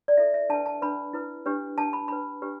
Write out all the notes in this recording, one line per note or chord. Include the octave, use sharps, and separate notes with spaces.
D5
E4 A4 E5
E5
D4 B4 A5
A5
D4 B4 B5
E4 B4
D4 G4 B4
D4 B4 A5
B5
D4 B4 B5
D4 G4 B4